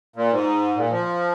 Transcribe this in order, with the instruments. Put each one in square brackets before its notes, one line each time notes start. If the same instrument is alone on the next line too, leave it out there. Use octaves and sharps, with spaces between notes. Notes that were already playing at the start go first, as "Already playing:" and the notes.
[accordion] A#2
G#2
A#2
F3